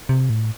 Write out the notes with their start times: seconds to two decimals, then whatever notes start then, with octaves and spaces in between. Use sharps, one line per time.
0.09 C3
0.30 A2